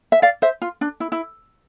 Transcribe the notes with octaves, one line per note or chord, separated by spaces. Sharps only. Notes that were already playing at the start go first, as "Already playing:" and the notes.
E5
D5 F5
C5 E5
F4
D4
E4
E4